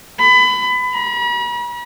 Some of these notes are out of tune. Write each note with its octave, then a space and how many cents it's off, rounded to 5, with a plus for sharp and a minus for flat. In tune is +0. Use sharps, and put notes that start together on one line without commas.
B5 +25
B5 -45